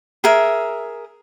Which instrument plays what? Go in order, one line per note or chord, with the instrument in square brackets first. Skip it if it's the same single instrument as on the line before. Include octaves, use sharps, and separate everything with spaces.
[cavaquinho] G#4 A#4 E5